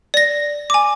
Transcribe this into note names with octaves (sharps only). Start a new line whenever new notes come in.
D5 A#6
G#5 D6